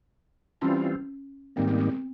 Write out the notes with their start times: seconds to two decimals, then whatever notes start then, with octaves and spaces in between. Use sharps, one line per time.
0.61 E3 G3 C4 C#4 F4
1.56 G#2 D#3 G3 A#3 C4
1.68 B3
1.78 C4